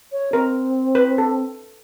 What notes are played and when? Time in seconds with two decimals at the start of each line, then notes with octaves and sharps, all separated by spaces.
0.12 C#5
0.33 C4 A#4
0.95 B4
1.18 A4